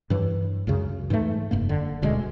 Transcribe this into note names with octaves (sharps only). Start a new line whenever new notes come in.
G2 E3 F#3
C#2 F#2 C#3
G#2 E3 F3 A3
F1 G2 A#3
D3
D#1 D2 B2 G#3